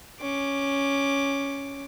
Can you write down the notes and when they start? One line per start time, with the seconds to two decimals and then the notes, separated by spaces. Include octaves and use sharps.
0.21 C#4 D6